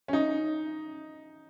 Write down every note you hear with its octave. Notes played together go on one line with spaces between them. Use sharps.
C#4
D#4